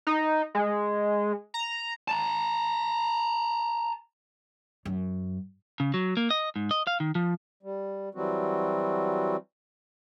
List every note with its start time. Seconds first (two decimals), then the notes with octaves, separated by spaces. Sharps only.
0.07 D#4
0.55 G#3
1.54 A#5
2.08 A5 A#5
4.85 F#2
5.80 C#3
5.94 F#3
6.17 A#3
6.31 D#5
6.56 G#2
6.71 D#5
6.87 F5
7.00 D#3
7.15 F3
7.63 G3
8.15 E3 F#3 G3 C4 F#4